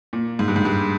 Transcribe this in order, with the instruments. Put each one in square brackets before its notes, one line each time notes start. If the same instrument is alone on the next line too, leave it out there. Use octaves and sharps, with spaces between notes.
[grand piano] A#2
G#2
G2
G#2
G2